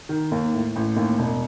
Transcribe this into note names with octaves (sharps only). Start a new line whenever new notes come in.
D#3
D#2
A2
A1
D#2
E1